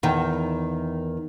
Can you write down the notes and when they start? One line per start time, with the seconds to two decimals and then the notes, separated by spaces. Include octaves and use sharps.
0.03 E2 D#3